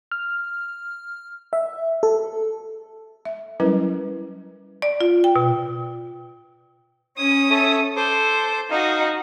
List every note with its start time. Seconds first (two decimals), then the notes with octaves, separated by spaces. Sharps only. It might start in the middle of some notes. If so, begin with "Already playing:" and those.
0.12 F6
1.53 E5
2.03 A4
3.25 E5
3.60 F#3 G3 C#4 E4 A#4 B4
4.82 D5
5.01 F4
5.24 G5
5.36 B2
7.17 C#4 D#6
7.50 A4 C#5 E5
7.96 A4 C5 D6
8.71 D#4 F#4 D#5 F5